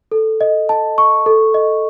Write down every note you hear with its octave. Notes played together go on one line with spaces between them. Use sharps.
A4
D#5
A5
C#6
A4
D#5